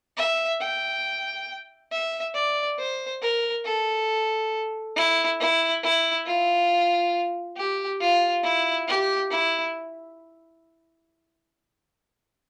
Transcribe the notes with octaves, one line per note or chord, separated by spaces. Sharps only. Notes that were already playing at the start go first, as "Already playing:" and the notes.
E5
G5
E5
D5
C5
A#4
A4
E4
E4
E4
F4
G4
F4
E4
G4
E4